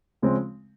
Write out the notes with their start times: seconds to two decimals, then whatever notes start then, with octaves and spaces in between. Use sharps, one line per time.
0.22 C#3 F3 G#3 C4